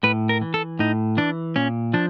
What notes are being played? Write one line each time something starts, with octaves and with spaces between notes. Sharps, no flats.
A2 B4
A#4
E3
A4
A2 D#4
E3 D4
A#2 C#4
F3 D4